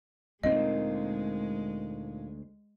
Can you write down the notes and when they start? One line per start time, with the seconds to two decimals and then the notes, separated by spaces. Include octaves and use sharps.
0.43 D2 A#2 G#3 A#3 C4 D#4 D#5